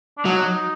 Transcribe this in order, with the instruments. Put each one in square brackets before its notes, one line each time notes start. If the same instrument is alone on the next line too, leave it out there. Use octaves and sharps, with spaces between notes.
[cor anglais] D4
[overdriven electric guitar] F#3 [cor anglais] D#4